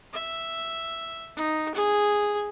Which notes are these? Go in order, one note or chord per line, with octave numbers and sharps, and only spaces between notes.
E5
D#4
G#4